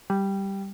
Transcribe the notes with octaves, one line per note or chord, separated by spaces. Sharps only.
G3